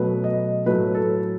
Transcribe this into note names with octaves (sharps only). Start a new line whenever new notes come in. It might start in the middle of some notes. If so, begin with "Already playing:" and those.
Already playing: B2 F#3 A3 B4
D#5
A2 F#3 A3 B4
A4